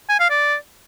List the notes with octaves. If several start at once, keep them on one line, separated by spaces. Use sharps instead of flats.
G#5
F5
D5